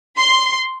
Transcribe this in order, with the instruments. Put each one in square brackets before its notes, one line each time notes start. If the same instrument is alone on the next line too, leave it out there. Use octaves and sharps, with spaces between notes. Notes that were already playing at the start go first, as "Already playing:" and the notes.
[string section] C6